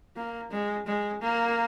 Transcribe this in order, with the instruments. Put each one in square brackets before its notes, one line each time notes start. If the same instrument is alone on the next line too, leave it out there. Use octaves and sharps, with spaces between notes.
[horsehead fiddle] A#3
G#3
G#3
A#3